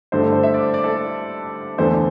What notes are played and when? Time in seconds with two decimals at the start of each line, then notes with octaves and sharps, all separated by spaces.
0.12 G2 D3 A3 C5
0.23 A4
0.33 C5
0.43 E5
0.54 D5
0.74 D5
0.84 A4
1.78 E2 D3 A3 C5